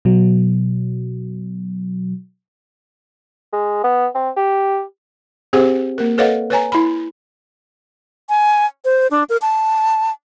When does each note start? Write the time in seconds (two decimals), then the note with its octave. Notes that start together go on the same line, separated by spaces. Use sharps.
0.05 B2 F#3
3.53 G#3
3.84 B3
4.15 C4
4.37 G4
5.53 C4 G4 G#4 C5 F#5
5.98 A#3 A#4
6.18 A4 B4 C#5 D#5 F5 F#5
6.50 B4 C#5 G#5 A#5
6.72 E4 B5
8.29 G#5
8.85 C5
9.11 D4
9.30 A#4
9.42 A5